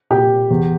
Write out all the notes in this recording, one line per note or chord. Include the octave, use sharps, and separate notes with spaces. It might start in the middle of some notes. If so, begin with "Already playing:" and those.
A#2 G4 G5
E2